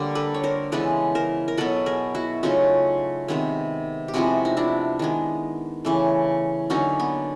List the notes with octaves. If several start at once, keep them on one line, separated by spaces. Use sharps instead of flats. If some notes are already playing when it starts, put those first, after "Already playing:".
Already playing: D3 G3 A#3
A4 B4
C#5
A#4 C5
C#3 E3 G#3 B3 A4 B4
A#4 C5
A#4
B2 F#3 B3 A4 B4
G#4 A#4
E4 F#4
C#3 F#3 A3 D#4 F4
C3 D#3 G#3 B3
G4
C3 F3 G#3 B3 E4 F#4
D#4
D4 E4
D#3 G#3 B3
C#3 E3 A3
D3 F#3 A#3 C#4 D#4
B3